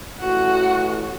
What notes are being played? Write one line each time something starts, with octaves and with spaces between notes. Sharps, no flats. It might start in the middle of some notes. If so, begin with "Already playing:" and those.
A1 F#4